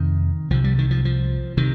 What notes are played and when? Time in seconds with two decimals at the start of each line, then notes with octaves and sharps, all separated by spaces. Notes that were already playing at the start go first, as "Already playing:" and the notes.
Already playing: F2 C3 D#3
0.50 C2 C3 F3
0.64 G3
0.78 D#3
0.91 F3
1.05 F3
1.57 C3 D#3